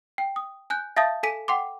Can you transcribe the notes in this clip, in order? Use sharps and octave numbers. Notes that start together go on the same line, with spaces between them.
G5
D#6
G#5 F#6 G6
E5 F5 A5 D#6 G6 A6
A4 G#5 B6 D#7
F#5 G5 C6 D6